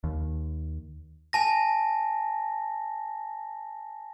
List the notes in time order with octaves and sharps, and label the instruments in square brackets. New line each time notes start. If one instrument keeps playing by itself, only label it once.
[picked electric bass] D#2
[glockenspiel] G#5 A5 A#6